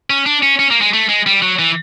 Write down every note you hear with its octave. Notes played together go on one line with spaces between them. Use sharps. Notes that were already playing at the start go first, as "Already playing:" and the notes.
C#4
D4
C#4
C#4
A#3
G#3
A3
G#3
G3
F#3
E3